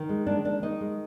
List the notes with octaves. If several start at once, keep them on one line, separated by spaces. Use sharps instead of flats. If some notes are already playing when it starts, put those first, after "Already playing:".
Already playing: D#3
G#3
G#3 D4
D#3 D4
D#3 D#4
G#3